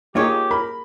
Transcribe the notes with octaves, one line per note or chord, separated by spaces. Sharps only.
A#3 D#4 F4 G4 G#4 C#5
A#4 B5